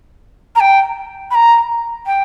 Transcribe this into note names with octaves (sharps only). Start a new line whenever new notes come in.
A#5
G5
B5
A#5
G5